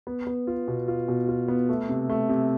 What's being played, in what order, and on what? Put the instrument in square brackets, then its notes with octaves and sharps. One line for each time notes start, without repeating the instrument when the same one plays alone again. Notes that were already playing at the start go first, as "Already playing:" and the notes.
[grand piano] B3
B3
F4
B2
F4
B2
F4
B3
A3
C3
A3
C3